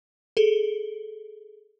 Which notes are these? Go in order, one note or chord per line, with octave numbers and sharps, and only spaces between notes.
G#4 A4